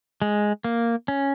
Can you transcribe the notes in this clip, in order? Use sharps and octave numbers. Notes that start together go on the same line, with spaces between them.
G#3
A#3
C#4